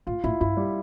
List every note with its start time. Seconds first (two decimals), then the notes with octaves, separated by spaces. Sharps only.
0.07 A2 F4
0.24 A2 E4
0.41 G2 E4
0.57 G3